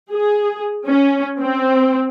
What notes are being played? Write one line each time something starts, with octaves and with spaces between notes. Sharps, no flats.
G#4
C#4
C4